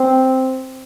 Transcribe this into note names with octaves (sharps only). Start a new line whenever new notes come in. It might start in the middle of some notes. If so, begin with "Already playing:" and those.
Already playing: C4